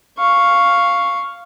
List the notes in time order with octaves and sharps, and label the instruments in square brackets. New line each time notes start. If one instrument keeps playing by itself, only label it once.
[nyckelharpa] F5 C#6